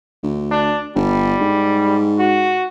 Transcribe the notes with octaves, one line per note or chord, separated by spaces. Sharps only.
D2
D4
G1 G3
G#2
F#4